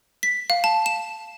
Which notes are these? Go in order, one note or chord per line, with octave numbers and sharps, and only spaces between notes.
B6
F5
A5
E7